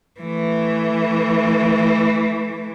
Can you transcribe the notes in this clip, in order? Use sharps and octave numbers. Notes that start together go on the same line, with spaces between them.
E3 A3